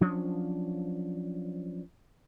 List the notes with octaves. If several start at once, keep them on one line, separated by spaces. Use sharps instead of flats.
F3 F#3 C#4 D4